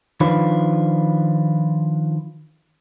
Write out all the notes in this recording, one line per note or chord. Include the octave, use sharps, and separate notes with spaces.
D#3 F3 D4 F4 B4